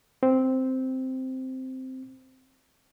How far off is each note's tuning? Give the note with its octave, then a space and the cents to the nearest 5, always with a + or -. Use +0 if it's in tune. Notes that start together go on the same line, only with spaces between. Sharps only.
C4 -5